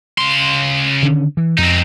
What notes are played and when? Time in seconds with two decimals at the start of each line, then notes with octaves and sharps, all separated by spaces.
0.18 C#3 C6
1.03 D3 D#3 C#4
1.37 E3
1.58 F2 C4 D#4